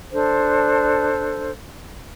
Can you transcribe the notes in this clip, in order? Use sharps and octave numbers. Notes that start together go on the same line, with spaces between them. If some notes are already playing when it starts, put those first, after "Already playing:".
D4 A4 C5